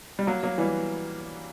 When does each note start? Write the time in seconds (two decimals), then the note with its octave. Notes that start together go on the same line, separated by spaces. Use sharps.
0.19 G3
0.27 F#3 A#3
0.43 F#3 A#3
0.58 E3 G3